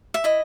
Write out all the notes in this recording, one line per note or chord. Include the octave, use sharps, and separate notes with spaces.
E5
E4 D#5